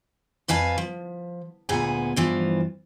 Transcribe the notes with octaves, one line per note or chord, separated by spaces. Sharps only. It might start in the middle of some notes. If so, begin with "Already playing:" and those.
F2 B4 F5 G#5 A5
F3
D2 A#2 B3 G#4 G#5
G2 E3 F3